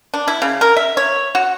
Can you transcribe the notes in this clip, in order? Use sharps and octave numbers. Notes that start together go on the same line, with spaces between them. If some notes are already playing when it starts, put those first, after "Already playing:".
D4
E4
C#3
A#4
E5
C#5
F#4